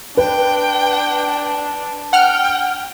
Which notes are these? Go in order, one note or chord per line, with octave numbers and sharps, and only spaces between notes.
D4 B4 G5
F#5 G5 F6